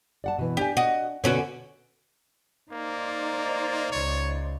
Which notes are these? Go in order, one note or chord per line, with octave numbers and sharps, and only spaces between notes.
D5 F#5 A5
B2 E3
D4 G4 G#5
F#4 D#5
B2 D3 C#4 F#4 C#5
A#3 D#4 C5 D5
C#2 C#5